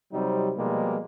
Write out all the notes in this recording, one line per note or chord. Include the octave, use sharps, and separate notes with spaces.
C3 F#3 G3 C4 D#4
B2 F3 G3 G#3 A#3